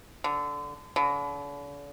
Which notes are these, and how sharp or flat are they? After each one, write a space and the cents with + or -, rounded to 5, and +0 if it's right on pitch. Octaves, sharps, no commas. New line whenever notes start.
D3 -10
D3 -45